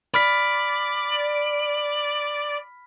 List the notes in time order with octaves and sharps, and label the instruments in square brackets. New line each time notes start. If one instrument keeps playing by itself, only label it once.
[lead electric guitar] D5 [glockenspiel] B5 F6 B6